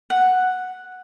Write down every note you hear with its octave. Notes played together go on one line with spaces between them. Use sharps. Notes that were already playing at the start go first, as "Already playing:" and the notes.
F#5